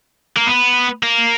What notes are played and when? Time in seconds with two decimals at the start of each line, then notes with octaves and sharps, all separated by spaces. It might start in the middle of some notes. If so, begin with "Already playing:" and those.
0.37 A#3
0.47 B3
1.03 A#3